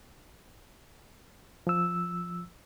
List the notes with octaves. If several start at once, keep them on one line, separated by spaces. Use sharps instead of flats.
F3 E6